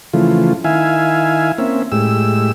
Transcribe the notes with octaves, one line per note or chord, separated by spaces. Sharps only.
C#3 E3 F3 A3 F4
D#3 E4 E5 F5 G#5
A#3 C4 C#4 E5
A2 G#3 G4 E6